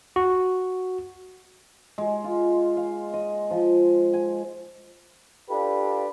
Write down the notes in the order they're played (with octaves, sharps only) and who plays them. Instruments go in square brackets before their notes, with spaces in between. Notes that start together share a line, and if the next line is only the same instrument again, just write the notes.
[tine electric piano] F#4
[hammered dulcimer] G#3
F4
F5
D#5
F3
G#5
[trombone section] D4 F4 G4 A4 B4